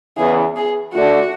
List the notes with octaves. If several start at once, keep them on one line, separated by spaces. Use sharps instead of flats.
E2 C#3 E3 B3 E4 G#4
G#4
D3 A3 D4 F#4 A4